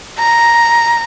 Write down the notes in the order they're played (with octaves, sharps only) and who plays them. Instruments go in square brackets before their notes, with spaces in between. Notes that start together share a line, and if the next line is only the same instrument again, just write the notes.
[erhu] A#5